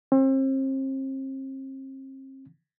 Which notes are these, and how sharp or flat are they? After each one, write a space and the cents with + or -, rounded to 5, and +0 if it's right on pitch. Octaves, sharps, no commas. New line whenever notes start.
C4 +40